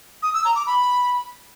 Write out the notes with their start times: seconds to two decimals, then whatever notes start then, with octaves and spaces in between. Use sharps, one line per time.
0.23 D#6
0.34 E6
0.45 A#5
0.56 D6
0.67 B5